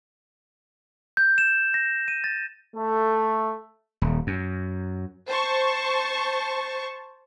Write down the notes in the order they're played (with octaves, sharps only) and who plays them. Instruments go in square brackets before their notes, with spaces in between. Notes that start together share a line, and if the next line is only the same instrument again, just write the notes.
[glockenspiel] G6
E7
A#6
D#7
A6
[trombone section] A3
[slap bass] D#1
F#2
[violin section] C5 A5 C#6